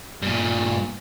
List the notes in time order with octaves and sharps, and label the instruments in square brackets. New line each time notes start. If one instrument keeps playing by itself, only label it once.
[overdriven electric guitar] G2 A#2